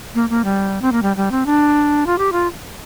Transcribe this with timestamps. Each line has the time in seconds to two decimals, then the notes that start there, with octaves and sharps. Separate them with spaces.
0.15 A#3
0.30 A#3
0.44 G3
0.82 C4
0.92 A#3
1.03 G3
1.17 G3
1.31 C4
1.46 D4
2.07 F4
2.18 G4
2.32 F4